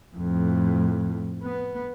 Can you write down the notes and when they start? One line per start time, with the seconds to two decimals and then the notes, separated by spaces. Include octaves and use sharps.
0.16 F2 A2
1.43 B3